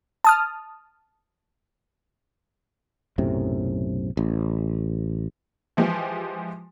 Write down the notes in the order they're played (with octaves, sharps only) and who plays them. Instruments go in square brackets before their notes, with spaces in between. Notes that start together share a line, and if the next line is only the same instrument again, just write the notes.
[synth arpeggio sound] A5 D#6 F6
[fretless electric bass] B1 F#2 A2 C3
A1
[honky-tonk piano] E3 F3 G#3 G4